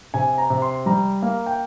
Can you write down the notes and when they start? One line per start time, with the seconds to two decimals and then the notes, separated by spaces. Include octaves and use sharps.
0.14 C3 G#5
0.38 A#5
0.50 C3
0.62 C6
0.86 G3 A#5
1.22 A#3
1.46 G5